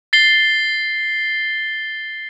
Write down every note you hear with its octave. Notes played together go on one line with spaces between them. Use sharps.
A6 C7 G7